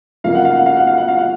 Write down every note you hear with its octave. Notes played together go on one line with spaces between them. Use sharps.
F#2 C#3 F3 A#3 F5
F#5
F5
F#5
F5
F#5
F5
F#5
F5
F#5